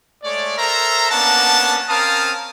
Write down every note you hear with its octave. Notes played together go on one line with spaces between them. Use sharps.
G#3 A3 C#5 D5
A4 A#4 C5 E5 A#5
A#3 B3 C#4 D4 F#5 A5
C4 C#4 A#4 F5 A5 D#6